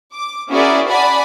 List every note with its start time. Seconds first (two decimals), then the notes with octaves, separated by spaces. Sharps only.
0.14 D6
0.50 C#4 E4 F#4 G#4 A#4 D5
0.89 D5 F#5 G#5 A5 B5